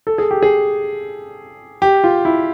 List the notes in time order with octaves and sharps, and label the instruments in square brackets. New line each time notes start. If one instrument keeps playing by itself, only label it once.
[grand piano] A4
G#4
G4
G#4
G4
F4
E4